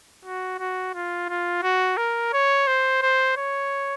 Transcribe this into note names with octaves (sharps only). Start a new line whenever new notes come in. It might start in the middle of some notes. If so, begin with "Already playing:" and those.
F#4
F#4
F4
F4
F#4
A#4
C#5
C5
C5
C#5